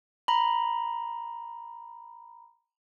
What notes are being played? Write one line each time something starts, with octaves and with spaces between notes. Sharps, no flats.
A#5 B5